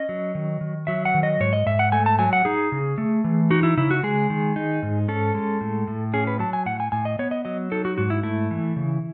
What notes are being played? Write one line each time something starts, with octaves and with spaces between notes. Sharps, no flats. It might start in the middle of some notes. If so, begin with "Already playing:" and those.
Already playing: C#4 D#5
F#3
D#3
D#3
F#3 E5
F#5
D#3
D#5
G#2 C#5
D#5
G#2 E5
F#5
A3 G#5
A5
F#3 G#5
F#5
D#4 G#4
C#3
A3
E3
D#4 F#4
E4
C#3 E4
F#4
G#3 G#4
D#3
D#4
G#2
C#4 A4
G#3
A2
A2
C#4 G#4
B4
F#3 A5
G#5
A2 F#5
G#5
A2 G#5
D#5
B3 C#5
D#5
F#3 D#5
D#4 A4
F#4
G#2 F#4
E4
A3 E4
E3
C#3